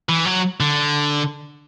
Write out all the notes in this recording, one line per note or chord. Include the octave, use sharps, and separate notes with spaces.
E3
F#3
D3